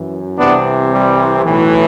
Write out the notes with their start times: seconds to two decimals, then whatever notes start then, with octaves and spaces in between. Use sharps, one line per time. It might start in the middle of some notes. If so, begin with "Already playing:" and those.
Already playing: F#2 E3
0.38 C2 C3 E3 B3 D4
0.91 G3
1.44 B1 A2 E3